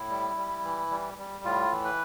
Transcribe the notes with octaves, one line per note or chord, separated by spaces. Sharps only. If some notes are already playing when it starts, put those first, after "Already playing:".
Already playing: A2 E4
G3
G3
E3
G3
G3
A2 F4
E3
B4